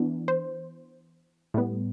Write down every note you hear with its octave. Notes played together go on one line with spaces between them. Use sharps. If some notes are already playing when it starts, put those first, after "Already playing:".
Already playing: E3 B3 D4
C5
A2 G3 B3